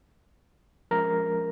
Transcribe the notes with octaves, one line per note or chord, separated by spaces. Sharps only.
F3 G#3 C#4 A#4 A#5